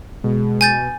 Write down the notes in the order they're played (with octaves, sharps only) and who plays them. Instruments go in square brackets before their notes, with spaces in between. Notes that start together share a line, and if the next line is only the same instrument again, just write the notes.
[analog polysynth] B2 [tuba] G#3
[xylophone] G#5 G6 A6